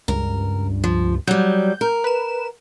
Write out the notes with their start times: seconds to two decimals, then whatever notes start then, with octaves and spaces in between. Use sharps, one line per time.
0.08 C#2 G2 A#4
0.84 F3
1.27 F#3 G3 G6
1.81 A#4
2.04 B4 E7